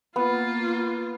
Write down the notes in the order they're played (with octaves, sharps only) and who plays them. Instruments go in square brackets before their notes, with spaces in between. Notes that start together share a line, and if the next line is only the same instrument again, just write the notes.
[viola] A#3 F4 [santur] B3